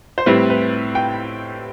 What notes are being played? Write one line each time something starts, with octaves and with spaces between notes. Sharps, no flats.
C5
A2 G3 C4 E4 B4
B4
G5